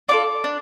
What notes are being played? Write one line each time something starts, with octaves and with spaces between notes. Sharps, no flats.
D4 F4 A4 D5 D6
D4